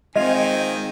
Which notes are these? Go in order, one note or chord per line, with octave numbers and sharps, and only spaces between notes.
D#3 G#3 C4 F4 D#5 G#5